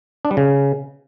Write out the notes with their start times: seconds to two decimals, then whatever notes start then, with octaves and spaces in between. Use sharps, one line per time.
0.25 D4
0.31 G3
0.37 C#3